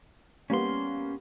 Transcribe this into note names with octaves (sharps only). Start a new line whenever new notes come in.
G3 A#3 B3 C#4 C6